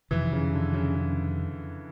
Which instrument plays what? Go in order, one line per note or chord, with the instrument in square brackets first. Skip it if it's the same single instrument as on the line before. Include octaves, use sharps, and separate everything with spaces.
[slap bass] F2 C3 D#3 [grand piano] E3
[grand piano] C#3
D3
C#3
C#3